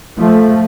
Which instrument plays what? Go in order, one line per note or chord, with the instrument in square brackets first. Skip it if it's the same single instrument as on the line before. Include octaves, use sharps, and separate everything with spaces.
[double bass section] F3 A3